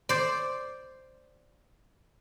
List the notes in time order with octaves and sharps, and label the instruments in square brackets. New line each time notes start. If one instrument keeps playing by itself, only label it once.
[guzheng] C5 D5